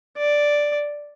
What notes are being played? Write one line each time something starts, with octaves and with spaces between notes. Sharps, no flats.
D5